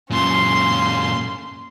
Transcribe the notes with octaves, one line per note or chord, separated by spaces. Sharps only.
F#2 A#2 C#4 C6